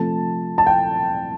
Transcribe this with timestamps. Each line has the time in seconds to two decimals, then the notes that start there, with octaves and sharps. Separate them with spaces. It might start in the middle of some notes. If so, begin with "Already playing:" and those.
Already playing: C3 F3 A3 A5
0.58 A5
0.67 G5